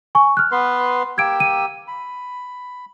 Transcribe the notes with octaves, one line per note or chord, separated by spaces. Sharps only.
G#5 C#6
F6 F#6
B3 B4 C6
A#3 G4 E6 G#6 D7
D#7
B5